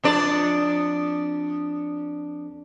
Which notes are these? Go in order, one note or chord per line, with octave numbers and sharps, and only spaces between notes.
F2 D4 D5